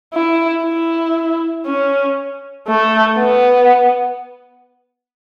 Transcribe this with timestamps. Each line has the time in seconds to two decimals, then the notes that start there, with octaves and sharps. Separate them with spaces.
0.14 E4
0.65 E4
1.67 C#4
2.68 A3
3.19 B3